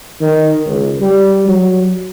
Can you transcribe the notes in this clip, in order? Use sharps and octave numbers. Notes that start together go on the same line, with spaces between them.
D#3
C#2
G3
F#3